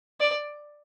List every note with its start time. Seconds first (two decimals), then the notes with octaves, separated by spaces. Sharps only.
0.20 D5